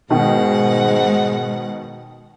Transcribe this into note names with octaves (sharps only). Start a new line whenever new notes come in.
G#2 B2 D#3 G#3 F#5